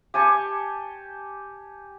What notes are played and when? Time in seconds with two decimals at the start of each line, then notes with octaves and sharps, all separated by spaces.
0.14 G4 G#5 A5 C#6